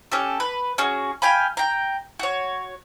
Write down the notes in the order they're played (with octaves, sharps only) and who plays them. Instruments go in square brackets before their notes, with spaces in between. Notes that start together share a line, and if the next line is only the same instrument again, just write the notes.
[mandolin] C#4 G4 A4
B4
C#4 F#4 G#4
F5 G5 G#5 B5
G5 A#5
F#4 C#5